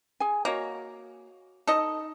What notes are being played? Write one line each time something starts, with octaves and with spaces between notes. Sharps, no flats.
G#4 G#5
A#3 F#4 C#5 D#5
D#4 A4 D#5